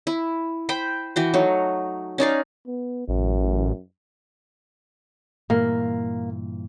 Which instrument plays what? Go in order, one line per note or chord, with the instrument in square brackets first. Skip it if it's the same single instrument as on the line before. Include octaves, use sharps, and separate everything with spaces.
[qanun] E4
C5 G5 B5
E3 F#4 G5
F#3 A3 D#4
C#4 D#4 D5 F5
[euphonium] B3
[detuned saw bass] A1 [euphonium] F#2
[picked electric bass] G2 A#2 E3 [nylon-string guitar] A#3